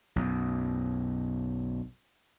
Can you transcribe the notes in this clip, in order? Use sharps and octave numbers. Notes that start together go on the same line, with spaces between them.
B1 F#2